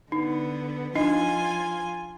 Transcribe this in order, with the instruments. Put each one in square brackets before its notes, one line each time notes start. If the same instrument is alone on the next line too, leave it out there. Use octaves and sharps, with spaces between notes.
[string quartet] D3 B3 [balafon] D#4
[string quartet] F3 F4 G#5 [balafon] D4 D#4 D#5